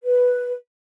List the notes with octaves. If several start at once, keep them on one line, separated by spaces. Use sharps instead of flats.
B4